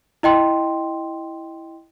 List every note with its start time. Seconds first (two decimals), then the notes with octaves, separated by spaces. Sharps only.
0.23 E4 D#5 G5 C6